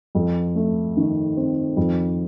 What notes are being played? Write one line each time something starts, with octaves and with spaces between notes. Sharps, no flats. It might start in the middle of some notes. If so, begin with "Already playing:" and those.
F2
A3
D#3
C4
F2